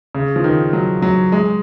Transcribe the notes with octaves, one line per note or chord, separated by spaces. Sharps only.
C#3
F3
D#3
F#3
F#3
G#3